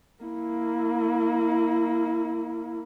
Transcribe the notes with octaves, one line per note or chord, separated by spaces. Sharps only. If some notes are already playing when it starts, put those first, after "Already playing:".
A#3 E4